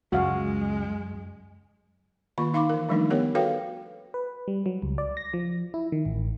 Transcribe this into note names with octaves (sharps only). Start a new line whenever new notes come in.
C#2 F#2 G#3 F#4 F5
D#3 A#3 F4 C#6
D#4 F5 B5 C6 D6
E3 A#4
D#3 F3 G3 A3 D4 D#4
B3 G4 A#4 C#5 F#5
F#4 A4 B4 C#5 F5 G5
B4
G3
F#3
C#2
D5
A#6
F3
E4
D#3
A1